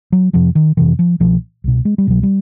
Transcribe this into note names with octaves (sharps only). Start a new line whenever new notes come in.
F#3
F2 C3 F3
D#3
F2 C3 E3
F3
C2 B2 F3
C2 B2
G#3
G3
C2 B2 F#3
G3